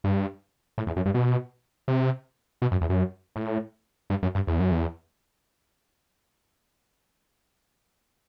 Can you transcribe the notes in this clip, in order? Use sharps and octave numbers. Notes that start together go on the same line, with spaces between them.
G2
A2
E2
F#2
G2
B2
C3
B2
F#2
E2
F#2
A2
G2
F#2
G2
E2
F#2
E2